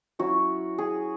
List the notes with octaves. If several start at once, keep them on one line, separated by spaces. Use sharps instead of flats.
F#3 C#4 E4 F#4
G#4